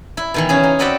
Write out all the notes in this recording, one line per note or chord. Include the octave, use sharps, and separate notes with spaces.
E4
B2 D#3 E3
C#3 C#4 G#4
D#4
C4 F#4 B4 D5 E5 G5